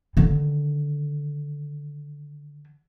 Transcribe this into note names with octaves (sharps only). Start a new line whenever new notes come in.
D3 D#3